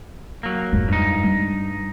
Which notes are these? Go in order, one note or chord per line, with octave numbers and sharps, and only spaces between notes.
F#3 A#3
F2 G#2
G2 D#4
G3